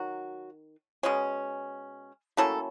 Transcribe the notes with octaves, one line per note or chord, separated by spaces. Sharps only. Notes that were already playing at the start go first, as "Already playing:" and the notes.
Already playing: D#3 F#3 F#4
B2 G#3 C#4
F#3 A3 A#3 C#4 E4 A4